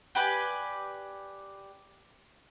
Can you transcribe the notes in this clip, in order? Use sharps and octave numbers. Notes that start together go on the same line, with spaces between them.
G4 B4 D5 G#5